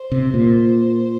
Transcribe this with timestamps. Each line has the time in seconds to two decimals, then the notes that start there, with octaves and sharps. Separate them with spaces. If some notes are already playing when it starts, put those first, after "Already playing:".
Already playing: C5
0.12 C3
0.34 A#2